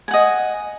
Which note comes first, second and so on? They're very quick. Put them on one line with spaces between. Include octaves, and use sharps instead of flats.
G#5 F#5 D#5